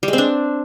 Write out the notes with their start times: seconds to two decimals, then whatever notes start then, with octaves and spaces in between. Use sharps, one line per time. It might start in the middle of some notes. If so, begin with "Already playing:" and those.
0.03 G3
0.08 G#3
0.13 C4
0.18 D4